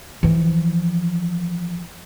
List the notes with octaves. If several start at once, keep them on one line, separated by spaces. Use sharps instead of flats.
E3 F3